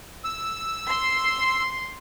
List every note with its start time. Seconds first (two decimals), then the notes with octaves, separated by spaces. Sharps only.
0.24 E6
0.89 C6